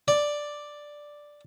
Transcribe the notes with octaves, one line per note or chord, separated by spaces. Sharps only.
D5